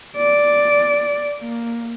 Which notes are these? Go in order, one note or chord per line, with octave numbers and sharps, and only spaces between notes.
D5
A#3